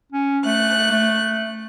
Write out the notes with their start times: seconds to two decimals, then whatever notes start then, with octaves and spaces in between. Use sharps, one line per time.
0.12 C#4
0.45 A3 F#6
0.91 A3